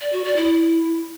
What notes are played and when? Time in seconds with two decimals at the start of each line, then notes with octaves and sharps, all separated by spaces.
0.01 D5
0.12 F#4
0.24 D5
0.36 E4